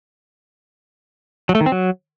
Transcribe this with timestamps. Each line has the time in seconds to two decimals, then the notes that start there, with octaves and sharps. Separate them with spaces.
1.49 F#3
1.55 A3
1.61 D#3
1.66 C4
1.72 F#3